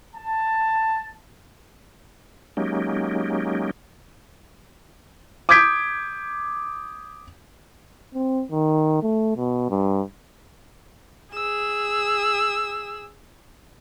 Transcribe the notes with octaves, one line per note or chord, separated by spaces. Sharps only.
A5
F#3 G#3 A#3 C#4 D#4 G4
D6 D#6 G6 G#6 B6 D7
C4
D#3
A3
B2
G2
G#4 E6